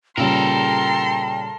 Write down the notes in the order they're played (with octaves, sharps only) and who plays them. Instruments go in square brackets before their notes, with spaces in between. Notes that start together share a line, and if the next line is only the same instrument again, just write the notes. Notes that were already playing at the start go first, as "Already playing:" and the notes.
[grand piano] A#2 C#3 G3 [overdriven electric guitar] A4 A#4 [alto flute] G5 [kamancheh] A#5 C6